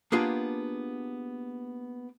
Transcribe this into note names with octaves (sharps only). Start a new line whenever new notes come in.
A#3 B3 D4 F4 G4 G#4